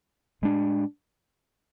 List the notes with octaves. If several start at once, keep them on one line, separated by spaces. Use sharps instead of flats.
A2 G#3 D4